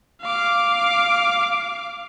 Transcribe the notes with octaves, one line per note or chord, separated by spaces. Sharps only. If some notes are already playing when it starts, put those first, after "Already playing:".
F5 D6